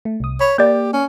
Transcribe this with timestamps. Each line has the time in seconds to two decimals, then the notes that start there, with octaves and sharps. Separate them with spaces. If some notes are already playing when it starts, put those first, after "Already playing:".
0.05 A3
0.20 C2 D#6
0.41 C#5 B5
0.58 A#3 G4 D5 G6
0.93 C#4